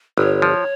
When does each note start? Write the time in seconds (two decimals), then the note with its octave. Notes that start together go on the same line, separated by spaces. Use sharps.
0.18 G1 C#5
0.42 F3